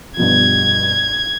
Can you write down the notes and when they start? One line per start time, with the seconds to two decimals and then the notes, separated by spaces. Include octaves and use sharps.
0.17 G2 B2 F3 G#6